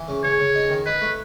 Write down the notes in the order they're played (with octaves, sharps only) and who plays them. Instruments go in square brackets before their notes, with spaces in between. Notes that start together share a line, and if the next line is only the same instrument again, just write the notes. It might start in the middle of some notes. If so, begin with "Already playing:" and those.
Already playing: [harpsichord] E3
C#3
[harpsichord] C#3 [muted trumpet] C#5
[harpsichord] C#3
D#4
D#3
[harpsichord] D#4 [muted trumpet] B4
[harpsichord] A3